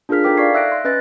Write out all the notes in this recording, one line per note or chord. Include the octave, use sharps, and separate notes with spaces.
D4 F4 G#4 A#4 F6 B6
D#4 A4 C5 G5 D6 B6
D5 F5 C#6 G#6 C7
E5 E6 F#6 A#6 D7
C6
C#4 B4 D#5 F#6 A6 A#6